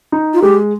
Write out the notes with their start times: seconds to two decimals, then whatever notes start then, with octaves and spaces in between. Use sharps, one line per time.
0.12 D#4
0.34 F4
0.42 G#3 G4